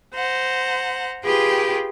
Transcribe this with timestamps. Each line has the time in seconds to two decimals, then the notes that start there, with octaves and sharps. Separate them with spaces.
0.14 C5 F#5 A#5
1.24 F4 G4 G#4 B4 G5